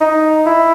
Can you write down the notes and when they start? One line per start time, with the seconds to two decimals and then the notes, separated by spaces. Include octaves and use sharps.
0.01 D#4
0.47 E4